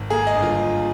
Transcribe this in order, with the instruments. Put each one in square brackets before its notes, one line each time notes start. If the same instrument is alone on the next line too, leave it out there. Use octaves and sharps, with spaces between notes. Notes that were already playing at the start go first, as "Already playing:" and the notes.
Already playing: [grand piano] G#1
A#3 G#4
D#5
G1
F4